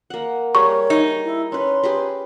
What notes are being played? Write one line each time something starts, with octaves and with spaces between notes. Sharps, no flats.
A#3 F#5
G3 G#4 A#4 C#5 C#6
D#4
E4
C#4 B4 C6
G4 G#4 B4